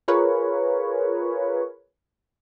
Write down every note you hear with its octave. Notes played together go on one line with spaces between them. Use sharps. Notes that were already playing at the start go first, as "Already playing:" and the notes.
F4 G#4 A#4 B4 C#5